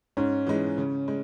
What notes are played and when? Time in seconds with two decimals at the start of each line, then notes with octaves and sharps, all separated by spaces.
0.17 G#2 C#4
0.47 E3 G#3 D#4
0.78 C#3
1.08 G#3